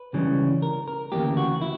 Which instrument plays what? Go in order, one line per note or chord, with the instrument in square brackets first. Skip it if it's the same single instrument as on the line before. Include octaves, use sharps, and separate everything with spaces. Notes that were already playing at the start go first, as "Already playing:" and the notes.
Already playing: [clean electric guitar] B4
C#2 C#3 E3 G3 C#4
A#4
A#4
D2 C#3 E3 A#3 G4
F#4
E4